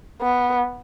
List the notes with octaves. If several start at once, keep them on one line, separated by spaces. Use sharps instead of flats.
B3